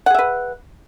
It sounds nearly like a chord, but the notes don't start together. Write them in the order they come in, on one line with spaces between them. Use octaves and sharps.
F#5 G#4 E5 B4